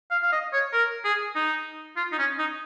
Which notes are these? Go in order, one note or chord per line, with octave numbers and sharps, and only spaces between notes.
F5
F5
D#5
C#5
A#4
G#4
D#4
F4
D#4
C#4
D#4